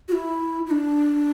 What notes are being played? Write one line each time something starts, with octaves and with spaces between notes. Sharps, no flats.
F#4
E4
E4
D4